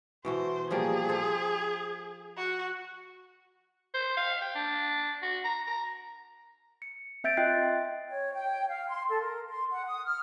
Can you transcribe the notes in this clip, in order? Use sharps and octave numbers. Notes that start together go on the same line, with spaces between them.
B2 E3 F#4 C5
F3 G3 A#3 G#4
A4 C5
F#4
C5
F5
G5
D4
F#4
A#5
A#5
C#7
C4 E5 G6 A6 D7
F4 D#5 G5 F#6 A6 C7
G5
C#5
G5
F5
C6
A4
A#4
C6
F#5
D#6
F6